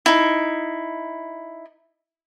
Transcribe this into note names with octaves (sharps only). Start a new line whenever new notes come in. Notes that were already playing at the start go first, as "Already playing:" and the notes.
D#4 E4